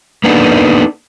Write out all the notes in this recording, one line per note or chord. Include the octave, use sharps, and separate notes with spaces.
A#3 B3 D4 D#4 A4